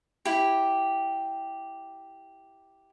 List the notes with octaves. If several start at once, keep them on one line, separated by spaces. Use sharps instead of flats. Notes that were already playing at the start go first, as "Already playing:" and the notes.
E4 G4